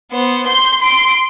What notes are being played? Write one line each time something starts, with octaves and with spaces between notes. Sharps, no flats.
B3 C5
C6 G6
C6 D7